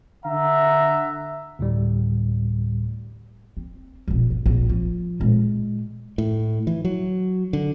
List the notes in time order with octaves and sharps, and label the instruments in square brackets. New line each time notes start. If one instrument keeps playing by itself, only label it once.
[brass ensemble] D3 E5 F#5 A#5
[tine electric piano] D2 A2 G3
[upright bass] C4
E1 A#1
G1
A#1
F3 F4
A#2 G#3
[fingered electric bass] A2
E3
F#3
D3